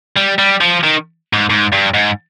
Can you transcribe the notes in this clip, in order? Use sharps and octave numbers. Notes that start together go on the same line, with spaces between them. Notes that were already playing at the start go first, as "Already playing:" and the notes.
G3
G3
F3
D#3
G#2
G#2
G2
G#2